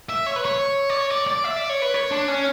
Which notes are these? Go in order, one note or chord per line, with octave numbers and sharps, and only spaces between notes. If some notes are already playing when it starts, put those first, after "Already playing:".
E5
C#5
B4
C#5
D5
C#5
D5
D5
E5
D5
C#5
B4
C#5
D4
C#4